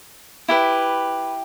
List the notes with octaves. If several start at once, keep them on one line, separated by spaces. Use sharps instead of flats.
E4 G4 B4